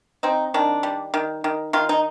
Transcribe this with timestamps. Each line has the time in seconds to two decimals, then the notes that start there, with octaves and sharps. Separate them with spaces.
0.23 C4 D#4
0.54 D#3 D4
0.83 G3
1.14 D#3
1.44 D#3
1.73 D#3 F4
1.89 D#4